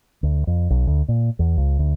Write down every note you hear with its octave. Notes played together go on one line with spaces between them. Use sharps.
D2
F2
B1
D2
A#2
E2
C#2
D2